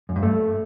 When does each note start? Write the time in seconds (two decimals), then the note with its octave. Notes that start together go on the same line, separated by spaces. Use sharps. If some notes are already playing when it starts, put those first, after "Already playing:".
0.09 F#2
0.16 G2
0.23 A3